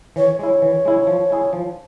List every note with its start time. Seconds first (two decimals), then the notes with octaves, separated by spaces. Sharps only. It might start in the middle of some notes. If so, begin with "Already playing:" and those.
0.16 E3 C#5
0.39 G#3 E4 C#5
0.62 E3
0.85 G#3 E4
1.07 F3
1.30 G#3 E4 G#4
1.53 F3